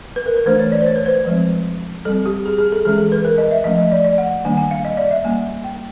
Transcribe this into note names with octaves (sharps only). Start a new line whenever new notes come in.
B4
A#4
B4
E3 A3 D4 C5
C#5
D5
C5
C#5
B4
C5
B4
F3 G#3 C4
G3 C4 A4
G4
G#4
G#4
A4
E3 G#3 C#4 G#4
A4
B4
A#4
D#5
E5
F3 A3 C#4 D#5
D#5
D5
D5
F#5
D#3 G3 A#3 D4 G#5
G#5
F5
D#5
D5
E5
G3 A#3 C#4 G#5
G5